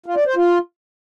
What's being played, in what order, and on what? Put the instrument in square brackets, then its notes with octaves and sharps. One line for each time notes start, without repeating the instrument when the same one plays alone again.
[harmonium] F4
D5
C5
F4